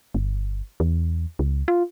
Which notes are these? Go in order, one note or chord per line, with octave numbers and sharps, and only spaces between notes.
G1
E2
C#2
F4